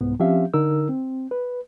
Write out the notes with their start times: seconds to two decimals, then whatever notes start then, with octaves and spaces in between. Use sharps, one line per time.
0.01 C2 G#2 B3
0.20 F3 C4 C#4 G4 E5 F5
0.54 D3 D#4 A#4 E6
0.89 C4
1.31 B4